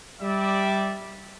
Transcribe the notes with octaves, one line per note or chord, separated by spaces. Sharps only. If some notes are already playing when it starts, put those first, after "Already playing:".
G3 D5 E5